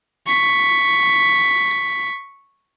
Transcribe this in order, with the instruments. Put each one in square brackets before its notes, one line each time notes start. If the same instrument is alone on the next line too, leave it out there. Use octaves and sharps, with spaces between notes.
[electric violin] C#6 B6